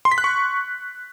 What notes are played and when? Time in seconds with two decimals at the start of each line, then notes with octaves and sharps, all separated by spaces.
0.05 C6
0.12 B6
0.18 F#6
0.24 C#6